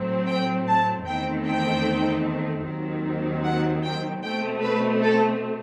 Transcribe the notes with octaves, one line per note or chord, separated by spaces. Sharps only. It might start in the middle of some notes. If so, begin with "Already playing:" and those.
Already playing: A2 F#3 C4
G5
A5
E2 D#3 A3 C4 G5
G5
D#2 D#3 F#3 C4
F#5
G5
B2 A3 C4 G5
B4
A4